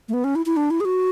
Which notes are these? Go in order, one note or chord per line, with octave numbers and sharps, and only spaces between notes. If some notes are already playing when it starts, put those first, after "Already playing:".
A3
B3
C#4
E4
E4
D4
E4
G#4
F#4